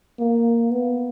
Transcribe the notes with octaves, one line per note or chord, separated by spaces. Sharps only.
A#3
B3